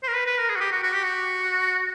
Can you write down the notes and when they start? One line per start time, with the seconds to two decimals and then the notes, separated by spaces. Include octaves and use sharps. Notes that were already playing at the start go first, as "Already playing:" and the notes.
0.03 C5
0.08 A#4
0.14 B4
0.26 B4
0.38 A#4
0.49 G#4
0.56 F#4
0.61 G4
0.72 F#4
0.83 F#4
0.93 G4
1.04 F#4